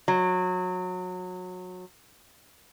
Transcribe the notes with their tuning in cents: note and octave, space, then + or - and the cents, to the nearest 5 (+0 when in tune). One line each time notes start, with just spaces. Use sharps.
F#3 -25